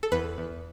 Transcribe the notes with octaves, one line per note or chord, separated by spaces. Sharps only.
A4
E2 B4
E2